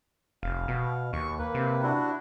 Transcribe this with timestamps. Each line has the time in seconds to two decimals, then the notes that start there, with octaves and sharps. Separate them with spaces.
0.43 F1 F5
0.68 B2
1.13 D#2 C#6
1.39 A#3 B4
1.54 C3
1.83 D4 E4 F#4